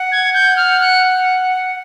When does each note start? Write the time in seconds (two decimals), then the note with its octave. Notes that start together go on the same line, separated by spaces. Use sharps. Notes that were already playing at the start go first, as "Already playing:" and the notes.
Already playing: F#5
0.12 G#6
0.34 G6
0.57 F6
0.81 F#6